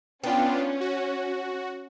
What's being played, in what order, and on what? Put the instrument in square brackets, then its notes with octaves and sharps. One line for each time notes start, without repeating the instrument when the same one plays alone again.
[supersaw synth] B3 D4 F4 [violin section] C#4 [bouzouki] G5
[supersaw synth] F#4